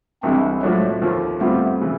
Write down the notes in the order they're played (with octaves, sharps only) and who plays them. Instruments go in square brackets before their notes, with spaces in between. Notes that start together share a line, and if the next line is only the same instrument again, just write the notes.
[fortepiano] C2 C3 E3 G#3 [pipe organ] C4 D4
[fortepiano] A2 F3 A3 D4 F#4 [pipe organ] F#3 G#3
[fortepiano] D#2 D3 F3
[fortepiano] G2 D3 G3 C4 F4 [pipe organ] A3 B3
[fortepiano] C#3 E3